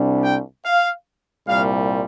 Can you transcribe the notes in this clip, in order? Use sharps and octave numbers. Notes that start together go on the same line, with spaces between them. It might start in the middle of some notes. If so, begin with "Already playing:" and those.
Already playing: C2 C3 G3 D4
G5
F5
C2 A#2 G3 F5